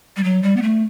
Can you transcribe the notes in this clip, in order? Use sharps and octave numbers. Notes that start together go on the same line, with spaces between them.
G3
F#3
G3
B3
A3